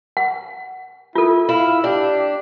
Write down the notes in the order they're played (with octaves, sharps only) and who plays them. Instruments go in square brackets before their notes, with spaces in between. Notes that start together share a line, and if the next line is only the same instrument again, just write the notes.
[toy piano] F#5
[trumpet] E4 [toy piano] F4 A4
[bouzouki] E4 [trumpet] F5
[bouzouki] D4 [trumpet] G4